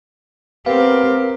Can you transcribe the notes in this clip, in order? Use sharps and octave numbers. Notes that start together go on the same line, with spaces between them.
B3 C4 G4 A#4 F5